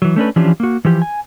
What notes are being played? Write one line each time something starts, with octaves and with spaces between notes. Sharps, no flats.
E3 F#3
A3 C#4 D4 B4
E3 F3 C#4 D4 F4 G4
A#3 F#4
E3 F3 G4
G#5